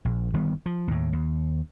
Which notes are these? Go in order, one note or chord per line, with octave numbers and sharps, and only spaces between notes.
A#1
G1 D#3 G3 B3
F3
D#2 A2
D#2